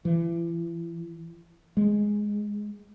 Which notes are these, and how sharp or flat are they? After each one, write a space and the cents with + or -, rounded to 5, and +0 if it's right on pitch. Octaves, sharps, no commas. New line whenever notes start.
E3 +35
G#3 +0